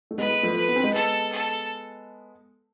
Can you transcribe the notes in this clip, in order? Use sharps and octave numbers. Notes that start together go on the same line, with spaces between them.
A3
G#3 B3 B4
F3 A3
B4
B3
C4
G#3 B3
A4
A4